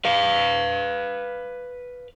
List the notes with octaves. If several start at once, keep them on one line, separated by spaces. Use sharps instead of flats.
B4 F5